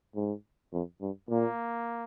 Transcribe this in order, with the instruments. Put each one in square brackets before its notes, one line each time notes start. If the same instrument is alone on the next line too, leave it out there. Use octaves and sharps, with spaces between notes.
[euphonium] G#2
F2
G2
[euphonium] A#2 [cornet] A#3